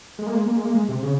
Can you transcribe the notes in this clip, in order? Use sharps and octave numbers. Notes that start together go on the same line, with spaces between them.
G#3
A#3
G#3
A#3
G#3
A#3
G#3
C3
C#3